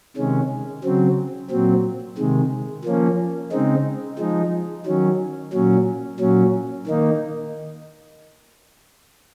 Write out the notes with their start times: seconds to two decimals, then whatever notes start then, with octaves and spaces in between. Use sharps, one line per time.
0.17 C3 D#3 G#3 C#4
0.84 C#3 F#3 C4
1.50 A#2 F#3 C4
2.18 C3 D#3 G#3
2.85 F3 A#3 C#4
3.52 C#3 G#3 C4 D#4
4.19 F3 G#3 D#4
4.86 D#3 F#3 C#4
5.53 A#2 F#3 C#4
6.20 A#2 F#3 C#4
6.87 D#3 A#3 D#4